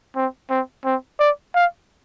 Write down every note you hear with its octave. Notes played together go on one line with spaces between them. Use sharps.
C4
C4
C4
D5
F5